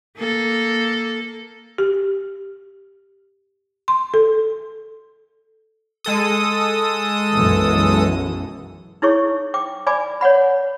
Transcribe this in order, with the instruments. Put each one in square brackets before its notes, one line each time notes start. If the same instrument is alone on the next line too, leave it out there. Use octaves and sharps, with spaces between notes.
[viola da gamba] A#3 A4
[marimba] G4
C6
A4
[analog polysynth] G#3 A4 D#6
[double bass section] B1 F#2 E3
[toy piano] D#4 E4 G#4 C#5 C#6
G5 D6
D5 G#5 B5 D6
C#5 D5 F#5 B5